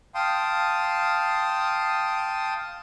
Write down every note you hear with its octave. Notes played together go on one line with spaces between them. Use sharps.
F5 G5 A5 C6 D#6